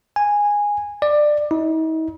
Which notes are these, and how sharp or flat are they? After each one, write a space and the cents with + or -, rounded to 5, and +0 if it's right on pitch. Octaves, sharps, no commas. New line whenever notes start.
G#5 -10
D5 +20
D#4 +45